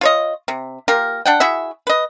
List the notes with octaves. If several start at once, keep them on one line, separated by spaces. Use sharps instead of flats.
F4 C#5 D#5
C3
A#3 F4 G4 A#4
D4 F#5 G5
E4 F#4 G#4 E5
B4 D#5